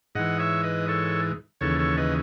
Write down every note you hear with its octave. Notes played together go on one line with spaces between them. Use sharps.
G#2 E3 D#5 F#5
C#5 E5
B4 D#5
A4 C#5
D#2 C#3 E3 A4 C#5
A4 C#5
B4 D#5